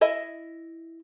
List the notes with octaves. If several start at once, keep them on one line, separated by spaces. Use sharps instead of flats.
E4 D#5 E5